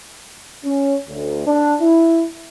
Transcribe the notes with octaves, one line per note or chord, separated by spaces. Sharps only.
C#4
D2
D4
E4